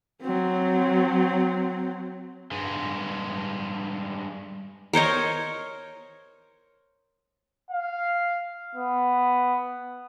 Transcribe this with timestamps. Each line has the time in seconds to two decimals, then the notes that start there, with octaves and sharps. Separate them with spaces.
0.22 F#3 C4
2.52 G2 G#3
4.93 A#4 C5 C#5 D#5
7.71 F5
8.75 B3